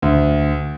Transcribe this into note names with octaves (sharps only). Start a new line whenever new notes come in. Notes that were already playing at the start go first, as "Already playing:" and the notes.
D2